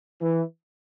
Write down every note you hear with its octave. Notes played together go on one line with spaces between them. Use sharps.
E3